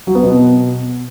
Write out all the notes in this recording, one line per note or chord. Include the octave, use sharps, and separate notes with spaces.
F#3
B3
B2